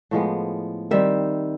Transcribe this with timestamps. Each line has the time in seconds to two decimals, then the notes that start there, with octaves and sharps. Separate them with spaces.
0.11 A2 F3 G#3 B3
0.91 D#3 G3 C4 E5